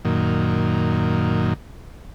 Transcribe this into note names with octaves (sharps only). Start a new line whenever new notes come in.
F#2 A#2 D#3